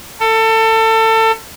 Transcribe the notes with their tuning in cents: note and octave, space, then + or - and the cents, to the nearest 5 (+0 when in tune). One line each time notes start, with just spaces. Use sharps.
A4 +25